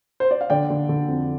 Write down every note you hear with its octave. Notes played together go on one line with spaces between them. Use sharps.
C5
D5
F5
D3 D5 G5
D3
D3
F2